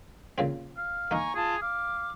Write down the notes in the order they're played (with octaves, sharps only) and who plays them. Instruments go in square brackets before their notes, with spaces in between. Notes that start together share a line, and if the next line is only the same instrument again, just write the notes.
[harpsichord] A#2 C#3 C4
[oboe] F5
[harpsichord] A#3 D#4 [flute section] G#5 A#5 C#6
[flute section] F4 A5 [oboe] G#4
[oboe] F5 [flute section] D6